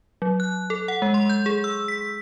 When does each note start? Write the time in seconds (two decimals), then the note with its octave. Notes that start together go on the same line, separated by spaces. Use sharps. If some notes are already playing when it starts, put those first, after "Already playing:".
0.22 F#3
0.40 F#6
0.70 A4
0.88 F#5
1.02 G#3
1.14 C6
1.30 G6
1.46 G#4
1.64 E6
1.88 B6